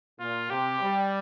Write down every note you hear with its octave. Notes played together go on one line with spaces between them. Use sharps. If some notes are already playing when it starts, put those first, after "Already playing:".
A#2 F4
C3 G4
G3